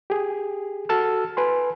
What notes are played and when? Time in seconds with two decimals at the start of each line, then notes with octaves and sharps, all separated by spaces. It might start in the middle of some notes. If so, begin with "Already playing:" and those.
0.10 G4 G#4
0.89 F#4 A4 A5 E6 F6
1.37 B4 G#5 C6